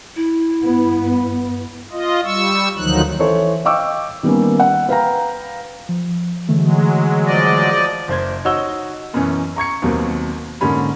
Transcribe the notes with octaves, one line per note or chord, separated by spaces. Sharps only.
E4
G2 B3
F4 D#5
G3 C#6 E6
D2 D#3 F3 F#3 D#4 F#6
E3 A4 C5 C#5
D#5 F5 G5 C#6 D6 E6
D#3 G3 A#3 B3 C#4
F#5
B4 F5 G5 A#5
F3
D3 E3 F#3 G#3 A3
F3 D5 D#5
F#1 C5 G#6
D#4 F#4 C#5 E6 G7
F#2 B2 E3 C#4
A#5 C#6 G#6 C#7
D#2 B2 F#3 A#3 C4
G#2 D3 A#3 C#4 B5